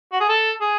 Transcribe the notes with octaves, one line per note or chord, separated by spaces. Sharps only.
F#4
G#4
A4
G#4